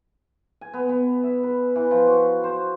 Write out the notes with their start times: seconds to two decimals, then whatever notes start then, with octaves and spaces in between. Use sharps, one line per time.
0.61 G#5
0.74 B3
0.89 B3
1.24 E5
1.43 B4
1.76 E3
1.91 F3
2.07 F#4
2.44 C5